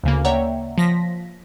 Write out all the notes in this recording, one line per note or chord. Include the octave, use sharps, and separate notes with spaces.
D2 C#3 A#3
C#5 D5 E5 F#5 G5 A#5
F3 A#6 B6